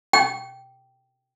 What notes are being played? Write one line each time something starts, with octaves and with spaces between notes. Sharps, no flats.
G5